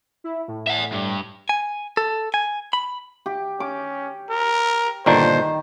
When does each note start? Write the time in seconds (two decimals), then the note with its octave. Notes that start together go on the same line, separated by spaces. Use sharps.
0.24 E4
0.48 A2
0.67 E5 F#5
0.92 G2
1.49 G#5
1.97 A4
2.34 G#5
2.73 B5
3.26 G4
3.60 C#4 D6
4.30 A#4
5.06 G1 A#2 D#3 D4 C5